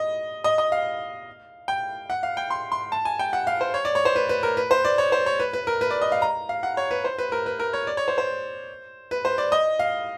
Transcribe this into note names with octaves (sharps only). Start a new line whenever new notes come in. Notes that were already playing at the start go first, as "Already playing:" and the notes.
Already playing: D#5
D#5
D#5
F5
G5
F#5
F5
G5
C6
C6
A5
G#5
G5
F#5
F5
C5
C#5
D5
C#5
C5
B4
B4
A#4
B4
C5
D5
C#5
C5
C#5
B4
B4
A#4
B4
D5
D#5
F5
A#5
F5
F#5
C#5
B4
C5
B4
A#4
B4
A#4
C#5
D5
C#5
C5
C5
B4
C5
D5
D#5
F5